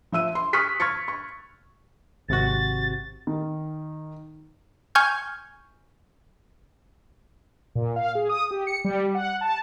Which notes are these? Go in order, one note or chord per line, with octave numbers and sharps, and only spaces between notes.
F3 E5 E6 D#7
C6
C#6 D#6 F6 F#6 B6 C#7
C#6 F6 G#6 A6 C#7
C#6
G#1 C3 F#4 A6
D#3
G#5 C#6 F6 G6 G#6
A#2
F5
G#4
D#6
G4
C#7
G3
F#5
A5